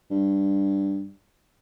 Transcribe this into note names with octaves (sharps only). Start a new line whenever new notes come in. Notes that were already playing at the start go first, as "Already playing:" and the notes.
G2